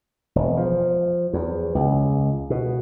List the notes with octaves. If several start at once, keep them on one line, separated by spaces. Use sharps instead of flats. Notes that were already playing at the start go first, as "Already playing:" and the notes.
E1
F3
E2
C#2
B2